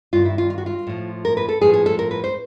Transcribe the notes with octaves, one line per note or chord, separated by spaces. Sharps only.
G2 D#3 F4
E4
F4
F4
F#4
F4
A2 F3
A#4
B4
A4
A2 F3 G#4
G#4
A4
A#4
B4
C5